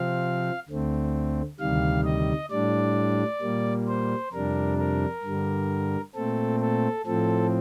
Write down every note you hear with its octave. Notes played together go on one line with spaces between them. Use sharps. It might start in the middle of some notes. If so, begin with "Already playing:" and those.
Already playing: C3 F3 C4 F5
D2 D3 A3 C4
D2 C3 D#3 G3 F5
D#5
A2 G3 D4 D5
A#2 G3 A#3
C5
F2 C3 G3 D4 A#4
A#4
G2 D3 G3
A#2 A3 C4 A4
A4
A2 F3 C4 A4